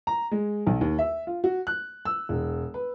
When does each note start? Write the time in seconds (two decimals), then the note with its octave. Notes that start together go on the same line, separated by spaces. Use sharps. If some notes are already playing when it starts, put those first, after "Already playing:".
0.07 A#5
0.31 G#3
0.67 B1
0.81 D#2
0.99 E5
1.27 F4
1.44 F#4
1.67 F#6
2.05 E6
2.29 E1
2.74 B4